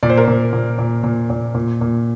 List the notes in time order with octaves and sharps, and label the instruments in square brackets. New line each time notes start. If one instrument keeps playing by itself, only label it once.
[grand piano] A#2 D5
C5
A#4
A#2 C5
A#2
A#2
A#2
A#2
A#2
A#2